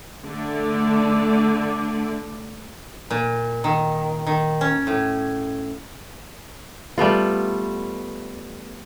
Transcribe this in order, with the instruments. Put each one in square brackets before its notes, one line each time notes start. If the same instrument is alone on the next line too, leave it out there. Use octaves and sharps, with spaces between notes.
[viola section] D3 A3 D5
[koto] A#2
D#3
D#3
C#4
A2
[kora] G3 A3 B3 F4